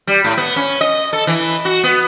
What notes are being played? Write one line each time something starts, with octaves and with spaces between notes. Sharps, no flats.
G3
A2
B3
C#4
D#5
A4
E3
F#4
B3